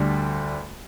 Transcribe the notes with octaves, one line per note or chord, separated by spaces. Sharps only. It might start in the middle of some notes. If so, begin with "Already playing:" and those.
Already playing: D2 D3 G3